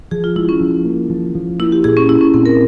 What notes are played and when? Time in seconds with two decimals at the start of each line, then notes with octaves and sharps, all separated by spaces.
0.11 F3 G#4
0.24 F4
0.36 G#3 E4
0.49 C#4
0.60 F3
0.85 A#3
1.10 F3
1.35 F3
1.59 A#3 E4
1.72 G4
1.84 A#2 G#4
1.97 C#4
2.09 A#3 E4
2.21 C#4
2.34 A#2 C4
2.46 A#4